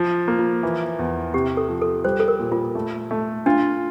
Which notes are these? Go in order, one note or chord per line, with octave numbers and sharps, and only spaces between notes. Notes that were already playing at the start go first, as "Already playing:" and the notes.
Already playing: F3
A#3
F4
E3
E2
C3 G4
A4
F3
A4
G3 C5
A4
A#4
A#2
F4
A3
A3
D4 F4